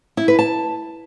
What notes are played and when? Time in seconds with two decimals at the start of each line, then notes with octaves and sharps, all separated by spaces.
0.17 E4
0.28 B4
0.39 A5